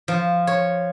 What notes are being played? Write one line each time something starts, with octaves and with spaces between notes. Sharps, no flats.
F3
C#5